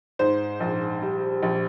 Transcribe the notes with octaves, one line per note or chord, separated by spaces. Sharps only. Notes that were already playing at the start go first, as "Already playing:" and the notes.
G#2 C5
A#1
G3
A#1